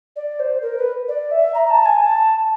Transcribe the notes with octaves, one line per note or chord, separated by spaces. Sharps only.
D5
C5
A#4
B4
D5
E5
A#5
A5
G#5
A5